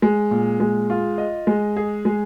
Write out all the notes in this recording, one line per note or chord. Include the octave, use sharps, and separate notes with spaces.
G#3
A#2
G#3
F4
D#5
G#3
G#4
G#3